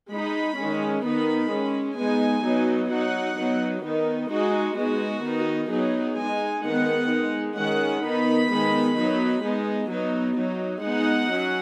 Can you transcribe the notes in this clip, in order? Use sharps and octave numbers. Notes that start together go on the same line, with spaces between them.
G#3 D#4 B5
D#3 G#3 C#4
D#3 B3 D#4 B5
G#3 C#4
G#3 B3 D#4 G#5
F#3 B3 D#4
F#3 D#4 F#5
F#3 B3 D#4
D#3 B3 D#4
G#3 D#4 F#4
G#3 B3 D#4 F#4
D#3 B3 D#4
F#3 B3 D#4 G#4
G#3 D#4 G#5
D#3 G#3 B3 D#4 F#5
G#3 D#4
D#3 G#3 C#4 F#5
D#3 B3 D#4 B5
D#3 G#3 B3 D#4
F#3 B3 D#4
G#3 B3 D#4
F#3 B3 D#4
F#3 D#4
G#3 B3 D#4 F#5
F#3 C#4